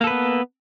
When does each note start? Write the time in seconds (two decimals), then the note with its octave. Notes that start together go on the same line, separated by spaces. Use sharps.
0.01 A#3
0.04 A4
0.07 B4
0.10 B3